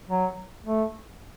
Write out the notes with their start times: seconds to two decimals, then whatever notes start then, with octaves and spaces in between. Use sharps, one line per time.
0.08 F#3
0.65 A3